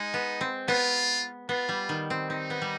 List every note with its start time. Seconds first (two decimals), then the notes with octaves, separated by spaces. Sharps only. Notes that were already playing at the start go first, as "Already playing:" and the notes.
Already playing: G#3 D#4
0.14 B3
0.41 C4
0.68 B3 F4
1.49 B3 F4
1.69 G3
1.89 D#3
2.10 C4
2.29 C4 D#4
2.50 B3
2.62 G3